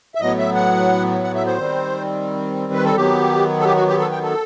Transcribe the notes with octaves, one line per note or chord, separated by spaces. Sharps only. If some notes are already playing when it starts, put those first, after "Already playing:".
E5
A2 F#3 B3 D#5
E5
F#5
F#5
E5
C5
D#3 G3 C4
B4
A4
D#3 F#3 B3 G4
A4
G4
F#4
G4
A4
G5
A4